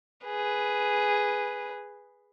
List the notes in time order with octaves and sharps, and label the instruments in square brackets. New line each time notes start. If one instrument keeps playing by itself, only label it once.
[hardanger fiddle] G#4 B4